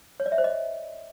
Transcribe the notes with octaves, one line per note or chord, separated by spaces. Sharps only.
C#5
D5
E5
C5
D#5